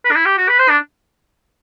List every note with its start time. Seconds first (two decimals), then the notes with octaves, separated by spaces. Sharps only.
0.05 B4
0.11 D4
0.16 E4
0.26 G4
0.38 F#4
0.48 B4
0.59 C5
0.69 D4